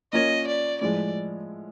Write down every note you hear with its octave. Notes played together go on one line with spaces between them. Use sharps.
A#3 C#4 F4 A#4 C#5 D#5
D5
A2 F3 G#3 D5